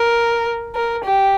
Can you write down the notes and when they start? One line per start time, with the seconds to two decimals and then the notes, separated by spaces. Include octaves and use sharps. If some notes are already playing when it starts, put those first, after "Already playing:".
Already playing: A#4
0.75 A#4
1.04 G4